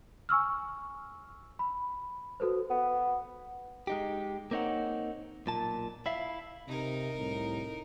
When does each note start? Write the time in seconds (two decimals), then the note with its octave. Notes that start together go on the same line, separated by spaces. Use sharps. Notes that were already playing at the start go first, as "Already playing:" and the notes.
0.29 G#5 C#6 E6 F6
1.59 B5
2.40 F#4 A4 B4 C5
2.70 B3
3.87 G#3 D#4 G4
4.51 A#3 C4 D#4 C#5 F#5
5.46 B1 A#2 A5
6.06 E4 E5 F5
6.68 C3 D#4 A#4
7.17 C2 A2